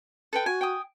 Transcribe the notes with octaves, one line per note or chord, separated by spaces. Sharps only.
A4 B4 G5
F#4 G#5
G5 G#5 D#6